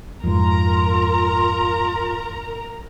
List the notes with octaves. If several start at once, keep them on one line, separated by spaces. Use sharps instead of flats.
F2 G#2 F4 A#4 A#5